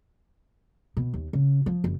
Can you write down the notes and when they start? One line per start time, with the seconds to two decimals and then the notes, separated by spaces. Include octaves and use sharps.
0.97 B2
1.14 D#2
1.33 C#3
1.66 F3
1.84 F#1